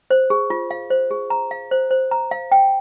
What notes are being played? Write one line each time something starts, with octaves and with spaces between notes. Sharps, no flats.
C5
G#4
F4
F5
C5
G#4
A#5
F5
C5
C5
A#5
F5
G5